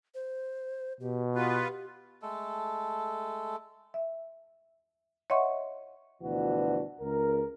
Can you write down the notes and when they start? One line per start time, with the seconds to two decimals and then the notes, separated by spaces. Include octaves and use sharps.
0.15 C5
1.01 B2 G4
1.35 B3 F4 G4 B4
2.22 G#3 A3 A4
3.94 E5
5.30 C#5 D#5 E5 F#5 C6 C#6
6.22 D2 B2 E3 F3 D4 F#4
7.01 C#2 A#4